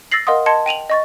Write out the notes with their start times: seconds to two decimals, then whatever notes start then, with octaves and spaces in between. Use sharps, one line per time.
0.12 E6 A6 A#6 C7 F#7
0.27 A#4 D#5 F5 F#5 C6 D#6
0.46 D#5 A5 C6 G#6 C#7
0.66 G5 D#7 F7 F#7
0.90 D#5 C#6 A6